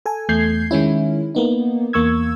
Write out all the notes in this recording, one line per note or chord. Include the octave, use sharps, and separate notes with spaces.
A4 G#5
E2 A3 G6 G#6 C7
D#3 G#3 C#4 E4
A#3 B3 D#4
E2 A#3 C#6 E6 G#6